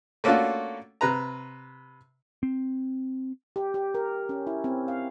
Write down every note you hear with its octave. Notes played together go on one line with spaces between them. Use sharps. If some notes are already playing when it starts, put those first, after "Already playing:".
A3 A#3 C#4 D4 F4 F#4
C3 B4 A#5
C4
G4
G4
A#4
C#4
E4
C4
F5